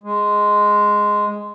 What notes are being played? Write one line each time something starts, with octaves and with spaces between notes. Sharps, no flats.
G#3